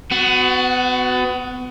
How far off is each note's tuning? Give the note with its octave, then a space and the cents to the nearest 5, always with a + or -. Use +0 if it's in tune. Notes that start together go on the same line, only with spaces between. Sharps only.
B3 +30 F#4 +0